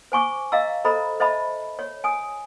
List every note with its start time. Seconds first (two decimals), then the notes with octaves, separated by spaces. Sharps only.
0.12 C5 G#5 C#6 D6
0.52 D#5 F5 A#5 E6
0.85 A4 C5 D#5 A#5 B5
1.20 C5 D#5 E5 A5 B5
1.79 C#5
2.04 G#5 D#6